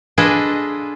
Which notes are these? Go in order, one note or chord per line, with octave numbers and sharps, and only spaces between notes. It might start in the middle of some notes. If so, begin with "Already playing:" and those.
D4 F4 G#4 A4 B4 D#5